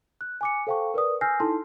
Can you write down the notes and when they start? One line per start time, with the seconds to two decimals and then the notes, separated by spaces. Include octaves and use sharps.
0.21 F#6
0.41 G#5 D6 C#7
0.67 A4 C5 F5 G5 A5 C#6
0.94 A#4 B4 D5 D#6
1.21 G#5 E6 F6 G6 A#6 C7
1.40 D#4 E4 A4 A5 C6